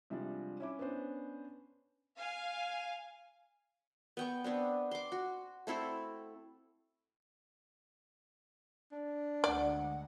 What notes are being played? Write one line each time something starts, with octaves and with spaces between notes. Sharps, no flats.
C3 F3 G3 G#3 D4
C#4 E4 D6
B3 C#4 D4 C5
F5 G#5
B3 G5 C#6
B3 C4 D4
C6 D6
F#4
A3 C4 E4 A4
D4
D2 G#3 D5 F#5